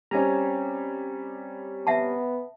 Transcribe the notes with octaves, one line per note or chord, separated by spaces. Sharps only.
G3 C4 C#4 G#5 A#5
B3 E5 F#5 A5